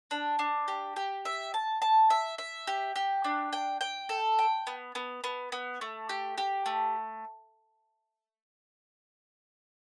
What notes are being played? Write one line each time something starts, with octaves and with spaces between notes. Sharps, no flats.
D4
D4
G4
G4
E5
A5
A5
E5
E5
G4
G4
D4
G5
G5
A4
G5
B3
B3
B3
B3
A3
G4
G4
A3